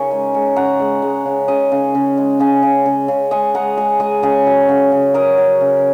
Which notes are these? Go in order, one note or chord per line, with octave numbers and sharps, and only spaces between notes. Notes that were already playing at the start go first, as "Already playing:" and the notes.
Already playing: C#3 C#4 D#4 A#4 C#5 D#5 G#5
G#3
G#3
C#3 F#5 A#5
G#3
G#3
C#3
C#3 D#5 G#5
C#3
C#3
G#3
C#3 D#5 G#5
C#3
C#3
C#3
G#3 D#5 G#5
G#3 F#5 A#5
G#3 D#5 G#5
G#3 D#5 G#5
C#3 D#5 G#5
F#3
C#3
C#3
F#3 A#4 D#5
F#3
C#3